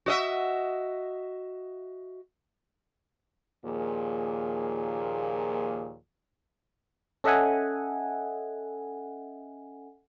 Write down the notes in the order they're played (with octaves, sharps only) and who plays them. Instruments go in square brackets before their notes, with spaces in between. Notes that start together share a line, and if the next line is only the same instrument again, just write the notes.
[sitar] F#4 D#5 E5
[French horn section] D#2 A#2 F3 A#3 G#4
[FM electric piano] C#4 A4 D#5 E5 F#5 G#5